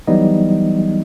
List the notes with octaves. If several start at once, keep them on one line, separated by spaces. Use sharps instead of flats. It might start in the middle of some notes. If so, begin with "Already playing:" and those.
E3 F#3 G3 B3 D#4 D#5